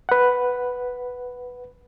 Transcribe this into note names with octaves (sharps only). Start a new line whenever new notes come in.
B4 F#5